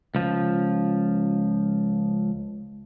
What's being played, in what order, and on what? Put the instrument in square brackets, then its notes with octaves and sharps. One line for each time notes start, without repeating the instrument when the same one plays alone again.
[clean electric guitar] C#2 F3